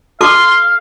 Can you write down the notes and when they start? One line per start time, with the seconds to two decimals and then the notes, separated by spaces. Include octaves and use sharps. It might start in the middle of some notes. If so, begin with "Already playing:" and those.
0.21 A4 F5 C6 D6